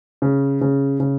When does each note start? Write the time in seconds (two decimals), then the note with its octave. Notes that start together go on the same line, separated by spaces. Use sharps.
0.22 C#3
0.61 C#3
1.00 C#3